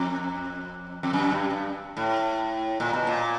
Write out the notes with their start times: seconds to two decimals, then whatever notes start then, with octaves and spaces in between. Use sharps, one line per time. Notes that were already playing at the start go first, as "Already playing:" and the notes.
Already playing: F2
1.03 F2
1.13 F#2
1.31 G2
1.50 G2
1.97 A2
2.80 A#2
2.93 B2
3.07 A#2